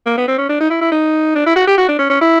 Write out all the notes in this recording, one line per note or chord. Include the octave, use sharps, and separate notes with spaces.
A#3
B3
C4
C#4
D4
D#4
E4
E4
D#4
D4
E4
F#4
G4
F#4
D4
C#4
C#4
E4